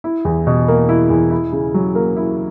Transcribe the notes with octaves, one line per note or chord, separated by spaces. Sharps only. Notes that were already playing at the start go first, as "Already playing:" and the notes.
E4
E2
B2
A#3
E4
E2
E4
C#3
F#3
A#3
E4